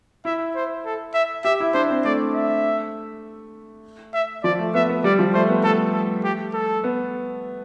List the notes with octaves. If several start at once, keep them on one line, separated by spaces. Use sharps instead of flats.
E4 E5
C5
A4
E5
G4 E5
E4
D4 C5
C4
A3 D5
E5
E5
F3 D5
A3
B3 E5
B3
G3 D5
F3
A3 C5
B3
A3 A4
A4
G4
A4
B3